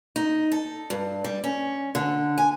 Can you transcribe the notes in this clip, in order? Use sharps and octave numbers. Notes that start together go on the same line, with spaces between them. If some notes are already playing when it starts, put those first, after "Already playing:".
D#4
A4
G2
G3
C#4
D3
G#5